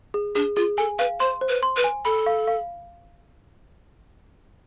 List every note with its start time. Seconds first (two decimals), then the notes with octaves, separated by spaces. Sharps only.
0.14 G#4
0.35 D4 G#4
0.57 F4 G#4
0.78 A4 G#5
0.99 B4 F5
1.20 C5 C6
1.41 C5
1.49 B4
1.63 C6
1.77 B4
1.84 G#5
2.05 A4 B5
2.26 F5
2.47 F5